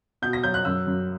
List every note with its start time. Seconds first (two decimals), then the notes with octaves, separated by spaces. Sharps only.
0.22 B2 G6
0.33 A#6
0.43 F#3 G6
0.54 F#6
0.65 F#2 E6
0.87 F#2